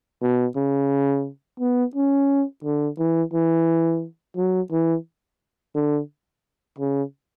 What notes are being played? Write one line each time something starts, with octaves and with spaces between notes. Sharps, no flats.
B2
C#3
B3
C#4
D3
E3
E3
F#3
E3
D3
C#3